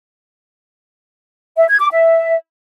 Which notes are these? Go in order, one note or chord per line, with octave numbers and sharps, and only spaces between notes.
E5
G#6
D6
E5